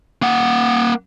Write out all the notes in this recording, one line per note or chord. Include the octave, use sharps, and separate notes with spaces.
A#3 F#5